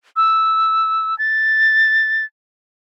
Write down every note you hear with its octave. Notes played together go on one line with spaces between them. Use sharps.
E6
A6